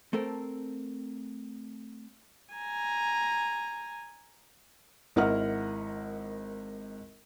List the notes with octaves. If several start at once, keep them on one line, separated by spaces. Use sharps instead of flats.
A3 C4 A4 A#4
G#5 A#5
G#1 E4 A#4 D#5 F#5 F6